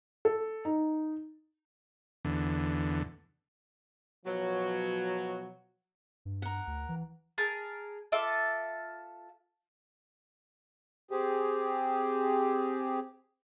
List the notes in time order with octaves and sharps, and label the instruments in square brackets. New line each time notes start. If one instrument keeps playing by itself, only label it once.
[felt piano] A4
D#4
[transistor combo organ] E2 D3
[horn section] B2 F3 F#3
[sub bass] G2
[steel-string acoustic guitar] A#4 F#5
[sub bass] D2
E3
[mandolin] G#4 A#4 A5
F4 A4 E5 D6
[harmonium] C4 G4 G#4